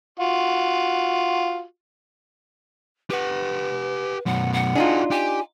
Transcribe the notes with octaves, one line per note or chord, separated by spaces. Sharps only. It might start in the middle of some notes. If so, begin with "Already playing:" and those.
F4 F#4
G4 B4 F#5
F#2 B2 F#5
F#5
D4 D#4 F4 F#4 G#4
G4 G#5